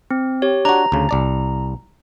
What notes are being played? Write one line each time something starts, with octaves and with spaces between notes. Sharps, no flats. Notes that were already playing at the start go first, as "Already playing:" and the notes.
C4
G4 C#5
D4 F#4 A#5
D2 C#3
C2 D5 A5